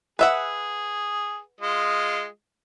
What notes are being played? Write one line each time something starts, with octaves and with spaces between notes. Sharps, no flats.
G#4 B4 E5 F#5
G#3 F4 D#5